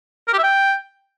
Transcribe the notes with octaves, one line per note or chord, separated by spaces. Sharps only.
A#4
G4
E5
G5